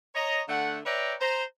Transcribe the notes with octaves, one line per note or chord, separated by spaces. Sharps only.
C#5 D#5 A#5
D3 A3 F#5
B4 C#5 D5 E5 G5 A#5
C5 A#5